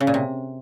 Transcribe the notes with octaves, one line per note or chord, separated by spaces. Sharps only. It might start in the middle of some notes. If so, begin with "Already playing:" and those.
C#3
A#2
C3